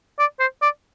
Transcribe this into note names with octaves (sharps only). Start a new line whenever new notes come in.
D5
C5
D5